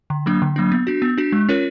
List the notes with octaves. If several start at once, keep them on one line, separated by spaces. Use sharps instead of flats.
D3
F#3 A#3 D4
D3
F#3 A#3 D4
B3
D4 F#4
B3
D4 F#4
G#3
C#4 F4 A#4 C#5